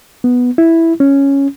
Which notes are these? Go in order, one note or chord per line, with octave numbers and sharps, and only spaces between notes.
B3
E4
C#4